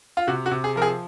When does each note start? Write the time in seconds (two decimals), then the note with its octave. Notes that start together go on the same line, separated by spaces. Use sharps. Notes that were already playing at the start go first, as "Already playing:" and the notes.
0.17 F4
0.27 C3 F#4
0.46 F#4
0.51 C3
0.64 G#4
0.76 F3 A#4
0.82 G#4